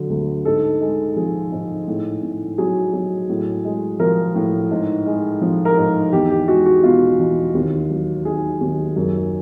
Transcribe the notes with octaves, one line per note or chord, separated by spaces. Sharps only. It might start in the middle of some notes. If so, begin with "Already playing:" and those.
Already playing: D3 F#3
D2
G#2 A4
G#3
F3 G#4
G#2
A2
A2
F#3 G#4
F#3
A2
G#3
F3 A#4
A2
G#2
G#3
F3
A#4
G#2
E2 G4
G4
G#3 F#4
F#4
B2 F4
E2
D#2
F#3
D#3 G#4
D#2
F#2